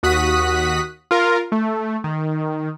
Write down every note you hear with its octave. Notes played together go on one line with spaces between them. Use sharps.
D#2 F#4 D#6 F#6 B6
F4 A#4
A3
D#3